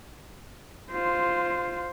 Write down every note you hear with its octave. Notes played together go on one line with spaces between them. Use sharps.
F4 C5